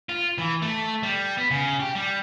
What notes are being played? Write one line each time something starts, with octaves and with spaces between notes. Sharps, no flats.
F4
E3
A3
G3
B3
C#3
G4
G3